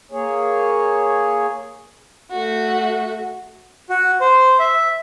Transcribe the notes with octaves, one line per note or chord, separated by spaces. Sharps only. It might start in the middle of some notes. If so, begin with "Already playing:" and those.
A#3 G#4 C#5
A3 F#4
F#4
C5
E5